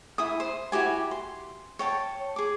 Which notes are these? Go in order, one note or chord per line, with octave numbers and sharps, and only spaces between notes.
E4 G#5 D#6
C5
E4 F#4 G4 G#5
C6
C#5 G5 A5
G#4 D6